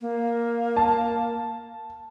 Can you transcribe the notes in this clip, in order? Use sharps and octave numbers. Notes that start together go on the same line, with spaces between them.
A#3
A5